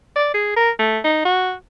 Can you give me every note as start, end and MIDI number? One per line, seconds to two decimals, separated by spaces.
0.16 0.30 74
0.34 0.55 68
0.57 0.70 70
0.79 0.99 57
1.04 1.21 63
1.26 1.53 66